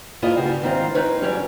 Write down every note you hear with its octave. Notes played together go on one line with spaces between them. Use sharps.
D2 G#2 A#3 E4 F4 D#5
G2 C#3 F#4 G4 B4
G#2 D#3 E3 C4 F4
D#4 A#4 B4 C#5
E2 G2 D3 F#3 G3 C#4